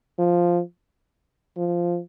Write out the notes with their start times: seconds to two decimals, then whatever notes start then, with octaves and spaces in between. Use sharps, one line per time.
0.18 F3
1.57 F3